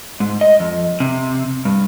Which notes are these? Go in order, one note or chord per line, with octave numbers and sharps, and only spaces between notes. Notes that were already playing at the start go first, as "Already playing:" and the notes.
G#2
D#5
F2
C3
G2